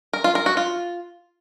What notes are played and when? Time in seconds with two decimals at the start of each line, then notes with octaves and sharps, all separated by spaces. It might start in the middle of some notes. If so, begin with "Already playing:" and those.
0.13 A#4
0.24 F4
0.35 A#4
0.46 F#4
0.57 F4